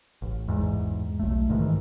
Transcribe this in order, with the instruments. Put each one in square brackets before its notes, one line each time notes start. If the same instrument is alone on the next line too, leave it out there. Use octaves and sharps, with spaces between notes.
[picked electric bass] A1
E2 G#2
B1 A3
A#1 G#2 D#3 E3